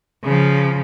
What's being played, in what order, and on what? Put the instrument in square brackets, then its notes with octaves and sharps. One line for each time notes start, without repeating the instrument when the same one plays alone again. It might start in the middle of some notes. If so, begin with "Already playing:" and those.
[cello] C#3 F3